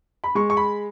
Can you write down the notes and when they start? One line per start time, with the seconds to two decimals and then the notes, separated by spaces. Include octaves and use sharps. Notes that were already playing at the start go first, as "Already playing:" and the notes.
0.24 B5
0.35 G#3 C#6
0.50 C#6
0.57 B5